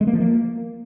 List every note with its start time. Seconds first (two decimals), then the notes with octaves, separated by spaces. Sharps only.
0.01 G#3
0.07 A#3
0.13 F3
0.20 A#3